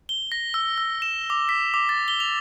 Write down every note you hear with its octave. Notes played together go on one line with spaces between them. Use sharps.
G7
A#6
E6
E6
E7
D6
B6
D6
A6
G7
F7